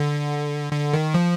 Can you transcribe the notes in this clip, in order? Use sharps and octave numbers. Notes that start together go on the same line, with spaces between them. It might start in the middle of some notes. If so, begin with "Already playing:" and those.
Already playing: D3
D3
D#3
F3